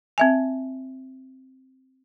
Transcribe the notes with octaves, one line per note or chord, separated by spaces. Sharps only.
C4 E5 G#5